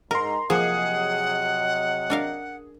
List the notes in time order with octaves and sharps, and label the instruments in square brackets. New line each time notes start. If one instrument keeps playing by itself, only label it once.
[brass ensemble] G#2 [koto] A#4 [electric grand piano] A#5 C6
[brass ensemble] C3 F#3 D#5 [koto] F3 A#3 [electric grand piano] G#4 [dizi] F#5
[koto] D4 A#4 F5